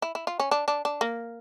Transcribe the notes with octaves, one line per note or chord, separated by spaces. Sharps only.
E4
E4
F4
C#4
D4
D4
D4
A#3